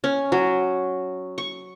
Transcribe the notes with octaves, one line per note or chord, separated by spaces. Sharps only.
C#4
F#3
C#6